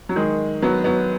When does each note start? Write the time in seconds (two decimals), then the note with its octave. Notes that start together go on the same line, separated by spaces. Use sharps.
0.09 F#3
0.16 D#3 G#3
0.62 F#3 B3
0.84 F#3 B3